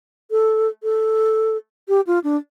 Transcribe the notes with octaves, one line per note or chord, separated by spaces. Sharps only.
A4
A4
G4
F4
D4